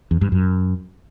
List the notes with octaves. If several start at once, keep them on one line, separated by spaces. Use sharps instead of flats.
E2
G2
F#2